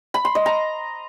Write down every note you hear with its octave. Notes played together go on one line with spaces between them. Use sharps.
B5
C6
D#5
A#5